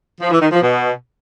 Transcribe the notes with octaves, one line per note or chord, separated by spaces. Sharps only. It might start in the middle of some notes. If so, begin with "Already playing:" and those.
F3
E3
D#3
F3
B2